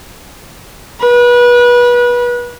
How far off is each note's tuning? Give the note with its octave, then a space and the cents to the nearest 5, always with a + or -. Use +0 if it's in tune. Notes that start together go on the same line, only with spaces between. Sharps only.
B4 -30